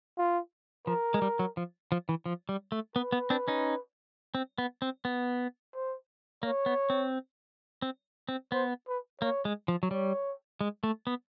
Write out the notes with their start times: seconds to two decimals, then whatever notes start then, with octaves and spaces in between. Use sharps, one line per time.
0.18 F4
0.87 F3 A#4
1.14 G#3
1.22 G3
1.39 F#3
1.57 F3
1.92 F3
2.09 E3
2.26 F3
2.49 G3
2.72 A3
2.96 B3 B4
3.12 B3
3.30 C4 D4
3.48 C#4 D#4
4.35 C4
4.58 B3
4.82 C4
5.05 B3
5.75 C5
6.43 A#3 C#5
6.66 B3
6.90 C4
7.82 C4
8.29 C4
8.52 B3 C5
8.88 B4
9.21 A#3 C#5
9.45 G#3
9.68 F3
9.83 F#3
9.91 G3 C#5
10.61 G#3
10.83 A3
11.07 B3